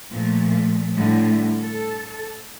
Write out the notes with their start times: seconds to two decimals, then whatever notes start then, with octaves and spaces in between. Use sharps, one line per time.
0.11 A#2 F3 A3
0.95 A2 D3 G3
1.61 A4